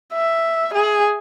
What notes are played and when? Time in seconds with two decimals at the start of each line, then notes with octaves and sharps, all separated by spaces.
0.13 E5
0.73 G#4